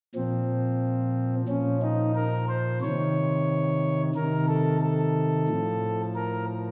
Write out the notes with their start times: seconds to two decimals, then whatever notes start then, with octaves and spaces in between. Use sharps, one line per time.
0.15 A#2 F3 C4
1.48 A#2 F3 C#4
1.82 D#4
2.15 A#4
2.49 C5
2.81 C3 D#3 C#5
4.15 C3 D#3 A#4
4.48 A4
4.82 A4
5.48 A2 F3
6.15 A#4